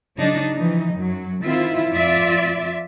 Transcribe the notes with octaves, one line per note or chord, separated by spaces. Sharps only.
C#3 F#3 D4 D#4
E3 F3 D#4
F#2 F#3
D#3 C4 E4 F4 E5
F2 F4 D5 E5